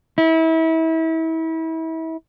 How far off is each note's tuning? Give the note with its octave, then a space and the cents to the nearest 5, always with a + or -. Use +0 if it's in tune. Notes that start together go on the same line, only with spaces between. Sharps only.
E4 -30